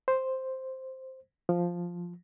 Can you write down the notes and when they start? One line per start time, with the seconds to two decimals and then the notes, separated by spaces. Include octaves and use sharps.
0.08 C5
1.49 F3